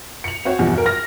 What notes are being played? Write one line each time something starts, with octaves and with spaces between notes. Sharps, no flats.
C#7 F7
C4 F#4 C#5
E2 G2 B2 F3
F#4 A#4
F6 A#6